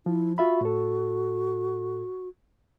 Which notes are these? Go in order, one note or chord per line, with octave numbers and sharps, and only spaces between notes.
F3 E4
F4 F#4 E5 B5
A2 A4